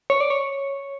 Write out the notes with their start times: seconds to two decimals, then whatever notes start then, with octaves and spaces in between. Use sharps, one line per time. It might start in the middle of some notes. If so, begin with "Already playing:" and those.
0.10 C#5
0.20 D5
0.30 C#5